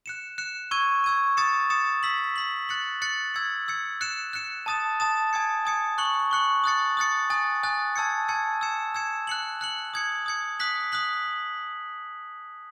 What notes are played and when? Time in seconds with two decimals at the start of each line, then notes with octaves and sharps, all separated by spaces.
0.06 F#6 C#7 E7
0.38 F#6 C#7 E7
0.71 C#6 E6 G#6 D#7
1.04 C#6 E6 G#6 D#7
1.37 D#6 A6 C#7 E7
1.70 D#6 A6 C#7 E7
2.03 E6 B6 F#7
2.36 E6 B6 F#7
2.69 F#6 A6 C#7 F#7
3.02 F#6 A6 C#7 F#7
3.34 E6 G#6 C#7
3.68 E6 G#6 C#7
4.01 F#6 C#7 E7
4.33 F#6 C#7 E7
4.66 A5 D#6 A6 E7
5.00 A5 D#6 A6 E7
5.33 G#5 D#6 G#6 C#7
5.65 G#5 D#6 G#6 C#7
5.98 C#6 F#6 C#7 F#7
6.31 C#6 F#6 C#7 F#7
6.64 D#6 F#6 A6 C#7
6.97 D#6 F#6 A6 C#7
7.30 G#5 D#6 F#6 A6
7.63 G#5 D#6 F#6 A6
7.96 A5 E6 G#6 C#7
8.28 A5 E6 G#6 C#7
8.61 E6 G#6 C#7 E7
8.95 E6 G#6 C#7 E7
9.27 F#6 C#7 F#7
9.61 F#6 C#7 F#7
9.94 D#6 G#6 C#7
10.26 D#6 G#6 C#7
10.60 D#6 F#6 B6 F#7
10.92 D#6 F#6 B6 F#7